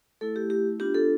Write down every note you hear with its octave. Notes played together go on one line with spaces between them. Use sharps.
A3 E4 A4
G4
G4
B3 D4 F4 G4
A4